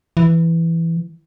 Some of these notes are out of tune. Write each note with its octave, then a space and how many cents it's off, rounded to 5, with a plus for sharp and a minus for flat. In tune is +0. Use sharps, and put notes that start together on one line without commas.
E3 +5